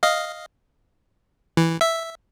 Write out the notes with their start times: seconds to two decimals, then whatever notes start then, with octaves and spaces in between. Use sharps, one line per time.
0.03 D#5 F5
1.57 E3
1.81 E5